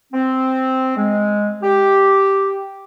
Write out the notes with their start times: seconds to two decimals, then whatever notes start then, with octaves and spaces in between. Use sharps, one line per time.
0.12 C4
0.96 G#3
1.62 G4